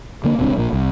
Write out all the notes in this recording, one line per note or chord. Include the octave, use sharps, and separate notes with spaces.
D3 A#3
D#1 C#2 C4 D4
A#1 A#2 A#3
C2